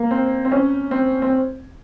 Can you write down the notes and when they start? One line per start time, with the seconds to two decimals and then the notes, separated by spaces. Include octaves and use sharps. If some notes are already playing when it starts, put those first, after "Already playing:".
Already playing: A#3
0.11 C4
0.45 C4
0.52 C#4
0.91 C4
1.22 C4